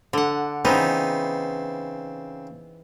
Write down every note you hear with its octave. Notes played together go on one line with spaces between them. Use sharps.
D3 F#5
C#3 E3 B3 C4 D#4